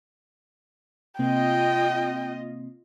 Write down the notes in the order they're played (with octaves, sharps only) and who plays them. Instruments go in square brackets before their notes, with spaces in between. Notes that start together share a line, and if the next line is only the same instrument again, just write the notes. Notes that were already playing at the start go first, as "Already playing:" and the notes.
[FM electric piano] C3 A#3 C4 [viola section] F4 D#5 [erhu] G5